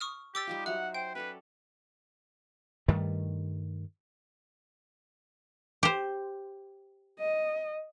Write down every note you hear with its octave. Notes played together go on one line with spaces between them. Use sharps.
C#6 D#6 F6
G4 D5 D6 E6 A6
G3 D#4 F4
F#3 C#5 E5 F#5
C5 G5
C#4 A4 B4 D5
G2 D#3 G3 A3
G4 C5
D#5